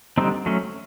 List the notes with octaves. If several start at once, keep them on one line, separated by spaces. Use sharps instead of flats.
D3 G3 C4 D#4
F#3 A3 C#4